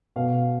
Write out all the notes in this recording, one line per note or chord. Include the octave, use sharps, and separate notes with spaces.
B2 F5